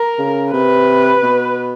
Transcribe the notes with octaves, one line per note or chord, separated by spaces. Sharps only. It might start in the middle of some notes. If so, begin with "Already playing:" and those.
Already playing: A#4
C#3
C3 B4
B2